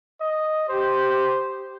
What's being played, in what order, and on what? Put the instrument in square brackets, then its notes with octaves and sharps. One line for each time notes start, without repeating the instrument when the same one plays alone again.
[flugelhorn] D#5
[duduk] G4 [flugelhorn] C5